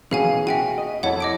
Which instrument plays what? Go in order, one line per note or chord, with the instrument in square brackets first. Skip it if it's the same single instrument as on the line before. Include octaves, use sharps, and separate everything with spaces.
[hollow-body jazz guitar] B2 E3 C#4 [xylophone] G#4 F5 G#5
[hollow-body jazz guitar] F#4 [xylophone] E5 G5 G#5
[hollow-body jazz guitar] D#5
[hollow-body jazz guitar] F2 E4 A4 [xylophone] C#5 F#5
[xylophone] D#5 D6 D7